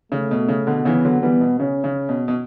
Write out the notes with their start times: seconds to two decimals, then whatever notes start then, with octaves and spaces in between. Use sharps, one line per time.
0.12 C#3 A3
0.31 B2
0.49 C#3
0.67 B2 D3
0.85 C#3 E3 B3
1.05 D3 F#3
1.22 E3 G3 B3
1.41 B2
1.60 C#3 C#4
1.84 C#3
2.09 B2
2.28 B2